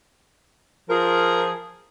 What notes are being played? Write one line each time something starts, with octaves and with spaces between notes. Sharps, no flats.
F3 F4 G#4 A#4